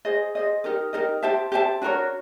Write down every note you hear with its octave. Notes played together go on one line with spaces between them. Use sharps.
G#4 C5 D#5
G#4 C5 D#5
D#4 G4 A#4 D#5
D#4 G4 A#4 D#5
G4 C5 E5 A5
G4 C5 E5 A5
D4 F#4 A#4 C#5